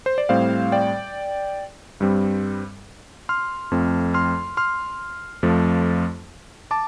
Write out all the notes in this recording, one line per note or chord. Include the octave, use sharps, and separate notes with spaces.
C5
D5
A2 G3 C4 C5 F5
D5 G5
G2 G3 C4
C6 F6
F2 F3 A3 C4
C6 F6
C6 F6
F2 F3 A3
A5 D6